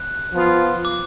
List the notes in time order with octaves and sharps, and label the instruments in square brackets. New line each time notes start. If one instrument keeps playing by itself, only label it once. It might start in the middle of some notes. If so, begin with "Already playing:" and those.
Already playing: [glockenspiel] F#6
[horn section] F3 B3 F4
[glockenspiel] D6